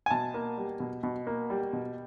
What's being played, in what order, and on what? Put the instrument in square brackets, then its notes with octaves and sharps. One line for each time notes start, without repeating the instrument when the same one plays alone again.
[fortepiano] G#5
B2 A5
A#3
G3
B2
B2
A#3
G3
B2